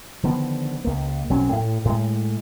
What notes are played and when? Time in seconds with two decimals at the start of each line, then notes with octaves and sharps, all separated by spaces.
0.23 D3 D#3 F3 B3
0.84 C#2 A#3
1.30 B1 F#3 C4 C#4
1.52 A2
1.85 A2 G#3